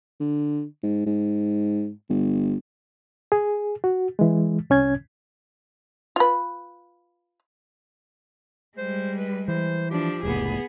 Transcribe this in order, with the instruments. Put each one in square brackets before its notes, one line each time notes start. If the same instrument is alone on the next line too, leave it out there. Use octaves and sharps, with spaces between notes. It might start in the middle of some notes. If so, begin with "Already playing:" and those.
[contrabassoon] D3
G#2
G#2
G1
[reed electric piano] G#4
F#4
E3 G#3
C2 C#4 G#6
[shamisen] F4 B4
[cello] G3 G#3 [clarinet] C5
[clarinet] B4
[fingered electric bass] E3 [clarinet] C5
[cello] F3 D4 [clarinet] G4
[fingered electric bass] F1 C#2 A2 [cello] B3 G#4